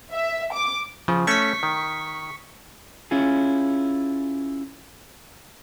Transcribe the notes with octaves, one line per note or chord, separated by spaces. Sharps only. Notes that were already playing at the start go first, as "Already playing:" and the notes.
E5
D6
C#3 F3
A3 C#4 C#6 B6
D#3
C#4 E4 F4 G#4